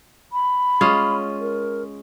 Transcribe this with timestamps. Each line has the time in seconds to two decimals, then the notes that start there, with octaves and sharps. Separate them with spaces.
0.33 B5
0.81 G#3 C#4 F4
1.40 A#4